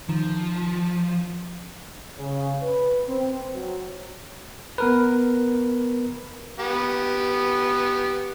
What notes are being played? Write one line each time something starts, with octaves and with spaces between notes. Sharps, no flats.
D#3 F3
C#3
B4
C4
F#3
B3 A#4 B4
B3 G4